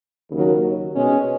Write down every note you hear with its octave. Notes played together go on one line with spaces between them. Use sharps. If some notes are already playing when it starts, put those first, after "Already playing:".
D#2 C#3 F#3
B2 G#3 C#4